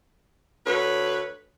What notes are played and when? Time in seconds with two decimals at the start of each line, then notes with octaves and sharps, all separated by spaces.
0.67 D2 B4 C#5